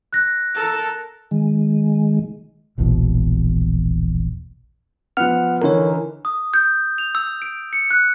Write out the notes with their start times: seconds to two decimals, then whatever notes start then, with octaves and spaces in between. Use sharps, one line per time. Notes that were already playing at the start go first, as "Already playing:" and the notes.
0.13 F#6 A#6
0.55 A4 A#4
1.31 D#3 G#3
2.78 E1 A#1 E2 B2
5.17 F3 B3 F#5 F6
5.62 D3 E3 D#4 A#4 C#5
6.25 D#6
6.54 G6
6.98 F7
7.15 E6
7.42 D7
7.73 C#7
7.91 F#6